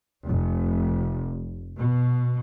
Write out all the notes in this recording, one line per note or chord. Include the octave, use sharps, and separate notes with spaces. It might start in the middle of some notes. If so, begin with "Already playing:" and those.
F1
B2